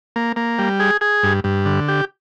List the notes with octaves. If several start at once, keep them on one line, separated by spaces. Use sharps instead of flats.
A#3
A#3
G3
G#4
G#4
G2
G2
D3
G4